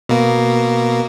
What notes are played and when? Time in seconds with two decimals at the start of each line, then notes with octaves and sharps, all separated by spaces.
0.09 B2 A#3